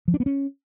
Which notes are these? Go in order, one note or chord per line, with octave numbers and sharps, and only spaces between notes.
F3
D4
B3
C#4